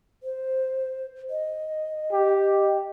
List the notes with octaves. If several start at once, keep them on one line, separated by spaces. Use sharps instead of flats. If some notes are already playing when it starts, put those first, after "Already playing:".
C5
D#5
G4